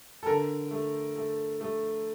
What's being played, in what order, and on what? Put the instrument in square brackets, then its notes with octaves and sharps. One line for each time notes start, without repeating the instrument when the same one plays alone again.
[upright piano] A4
[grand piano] D3 [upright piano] A#4
[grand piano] A3
A3
A3